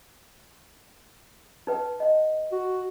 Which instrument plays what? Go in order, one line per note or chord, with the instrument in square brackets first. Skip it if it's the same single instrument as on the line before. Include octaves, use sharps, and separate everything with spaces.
[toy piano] D#4 B4 G5
D#5 F#5
[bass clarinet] F#4